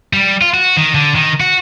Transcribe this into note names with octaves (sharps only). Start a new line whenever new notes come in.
G3
F4
F#4
D#3
D3
D#3
F#4